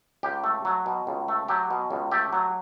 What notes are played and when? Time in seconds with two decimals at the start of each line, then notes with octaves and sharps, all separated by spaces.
0.23 C#2 G4
0.44 A3
0.65 F#3
0.86 B2
1.07 C#2
1.28 A3
1.48 F#3 G4
1.71 B2
1.90 C#2
2.12 A3 G4
2.33 F#3